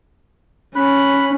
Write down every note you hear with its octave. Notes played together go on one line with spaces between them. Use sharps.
C#4 B5 F#6